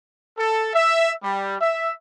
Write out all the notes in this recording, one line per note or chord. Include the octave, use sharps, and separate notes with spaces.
A4
E5
G3
E5